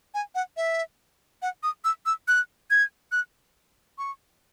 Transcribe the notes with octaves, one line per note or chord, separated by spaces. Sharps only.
G#5
F#5
E5
F#5
D#6
E6
E6
F#6
G#6
F#6
C#6